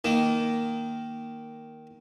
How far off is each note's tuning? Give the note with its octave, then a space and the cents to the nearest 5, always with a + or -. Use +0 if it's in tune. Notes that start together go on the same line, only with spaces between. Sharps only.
D#3 +0 A#3 +0